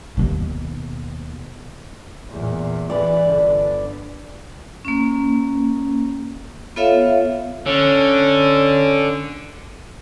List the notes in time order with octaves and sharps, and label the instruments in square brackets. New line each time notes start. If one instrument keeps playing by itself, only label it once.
[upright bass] D#2 B2
[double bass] E2 A#2
[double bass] E3 [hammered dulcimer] B4 D5
[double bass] G1 D3
[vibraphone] A#3 C#4
B3 F4 A4 C#5 E5 F5
[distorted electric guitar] D3 [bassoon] C#4